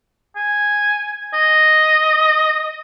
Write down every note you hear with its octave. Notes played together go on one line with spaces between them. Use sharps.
G#5
D#5